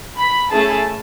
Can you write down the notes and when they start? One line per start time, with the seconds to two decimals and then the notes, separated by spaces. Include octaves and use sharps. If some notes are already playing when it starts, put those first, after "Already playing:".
0.18 B5
0.51 A3 C#4 E4 G#4 A5